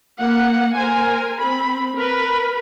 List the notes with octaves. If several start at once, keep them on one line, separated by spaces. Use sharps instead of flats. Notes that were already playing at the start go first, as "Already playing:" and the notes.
A#3 F#5
A#4 C5 G#5
C4 B5
A#4 B4 B5